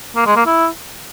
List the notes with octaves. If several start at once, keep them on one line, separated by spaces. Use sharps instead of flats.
A#3
G#3
A#3
E4